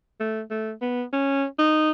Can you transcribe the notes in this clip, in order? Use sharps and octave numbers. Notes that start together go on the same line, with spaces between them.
A3
A3
B3
C#4
D#4